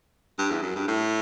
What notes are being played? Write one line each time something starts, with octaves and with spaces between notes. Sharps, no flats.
G2
E2
F#2
G2
A2